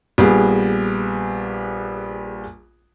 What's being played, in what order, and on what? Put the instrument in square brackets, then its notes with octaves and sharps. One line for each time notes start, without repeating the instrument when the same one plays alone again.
[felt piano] A#1 G3 B3 G#4